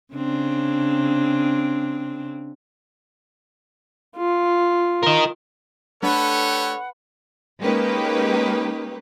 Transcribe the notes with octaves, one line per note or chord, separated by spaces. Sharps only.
C#3 C4 D4
F4
A#4 D#5
A3 D4 G4 A4 B4 C#5 F#5
G#3 A#3 C#4 D#4 G4 B4